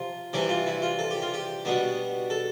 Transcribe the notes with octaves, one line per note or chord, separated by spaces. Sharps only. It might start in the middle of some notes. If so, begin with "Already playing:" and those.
Already playing: C3 F3 F4
C3 E3 G3 D4 G4
F4
E4
F4
A4
G4
F4
G4
B2 G3 B3 D4
A4